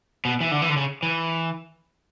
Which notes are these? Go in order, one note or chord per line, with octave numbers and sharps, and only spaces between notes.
B2
E3
D3
E3
D3
C#3
E3